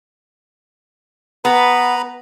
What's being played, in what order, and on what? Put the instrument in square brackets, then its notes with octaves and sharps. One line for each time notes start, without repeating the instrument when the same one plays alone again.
[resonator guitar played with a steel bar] B3 [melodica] B4 A#5 B5